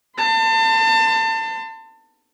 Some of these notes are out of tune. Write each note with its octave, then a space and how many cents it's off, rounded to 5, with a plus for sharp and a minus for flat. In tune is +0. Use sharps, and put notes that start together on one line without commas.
A5 +30 C6 -35